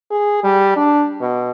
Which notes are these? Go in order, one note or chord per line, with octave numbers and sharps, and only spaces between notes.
G#4
G3
D4
B2